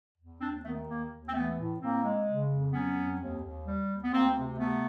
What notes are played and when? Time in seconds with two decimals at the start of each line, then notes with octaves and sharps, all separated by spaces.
0.18 E2
0.40 D#2 C4 D4
0.63 D#3 A3 B3
0.86 D#2 A#3
1.10 D#2
1.26 C4
1.33 E3 A3 B3
1.57 A2
1.79 A2 A#3 C4
2.03 G#3
2.26 C#3
2.50 F2
2.72 F#3 B3 C#4
2.95 F2
3.20 D#2
3.42 D#2
3.65 G3
3.90 D#2
4.03 B3
4.12 D2 A#3 C4
4.36 C3
4.59 C3 A3 B3